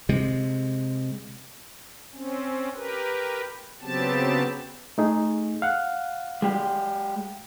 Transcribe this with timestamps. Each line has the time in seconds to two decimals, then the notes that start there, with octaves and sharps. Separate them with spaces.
0.09 C3 G#3
2.14 C4 C#4
2.75 G4 A#4 B4
3.82 C#3 F#3 B3 C4 G4 A5
4.98 A3 D#4 G#4
5.62 F5 F#5
6.42 G#3 G4